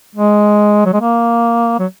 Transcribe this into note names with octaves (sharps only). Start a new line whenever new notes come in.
G#3
F#3
G#3
A#3
F#3